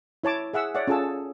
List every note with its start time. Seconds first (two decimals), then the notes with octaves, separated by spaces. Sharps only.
0.24 E4 C#5 A5 D6
0.53 G#4 E5 F#5 E6
0.75 C#5 D5 E5 F#5
0.87 C#4 F4 G#4 A4 A5 E6